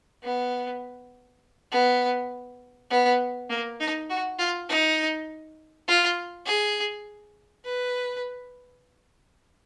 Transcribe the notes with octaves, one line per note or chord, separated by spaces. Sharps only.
B3
B3
B3
A#3
D#4
F#4
F4
D#4
F4
G#4
B4